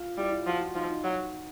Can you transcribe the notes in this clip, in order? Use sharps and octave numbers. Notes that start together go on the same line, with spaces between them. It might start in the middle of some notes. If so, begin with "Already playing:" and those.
Already playing: F4
G3 E4
F4
F3 F#4
F4
F3 D#4
D#4
F#3